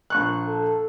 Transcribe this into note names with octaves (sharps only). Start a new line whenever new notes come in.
A#1 C#6 F#6
A4